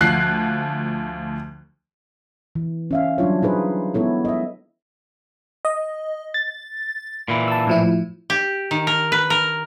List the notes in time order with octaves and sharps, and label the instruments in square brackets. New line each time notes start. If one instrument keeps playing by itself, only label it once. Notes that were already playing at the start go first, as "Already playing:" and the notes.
[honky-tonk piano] D2 F3 F#6 C7
[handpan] E3
C#4 E5 F5
F#3 G3 D4 F4 C#5
D#4 G#4 B4 C5
G#3 B3 E4 A4 C#5
D#5 E5
[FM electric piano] D#5
A6
[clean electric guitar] A#2 E3
[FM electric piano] A5 E6
A2 F3 E4
[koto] G4
D#3
A#4
B4
A#4